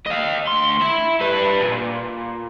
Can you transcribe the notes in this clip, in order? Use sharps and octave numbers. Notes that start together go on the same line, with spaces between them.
D#5 F5
D2 C6
E5 B5
G3 B4
A#2